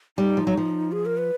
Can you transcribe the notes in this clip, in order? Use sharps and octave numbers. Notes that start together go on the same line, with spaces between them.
G3 D#4
F3
F#3
F3
G#4
A#4
B4